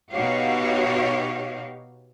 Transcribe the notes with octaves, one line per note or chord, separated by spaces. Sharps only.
B2 D#4 F#4 G4 C#5 F5